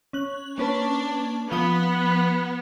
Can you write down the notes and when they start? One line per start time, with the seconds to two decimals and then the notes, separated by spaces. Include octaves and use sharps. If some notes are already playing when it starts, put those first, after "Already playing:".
0.13 C#4 F#6 F#7
0.58 A#3 C#4 D4 B4
1.52 F3 B3 D#6 G7